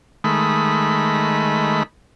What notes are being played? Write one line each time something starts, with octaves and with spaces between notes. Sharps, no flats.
D#3 G#3 A3 B5